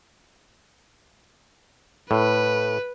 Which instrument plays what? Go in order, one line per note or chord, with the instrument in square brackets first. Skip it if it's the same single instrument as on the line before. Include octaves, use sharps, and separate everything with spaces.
[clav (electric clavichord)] A2 [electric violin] B4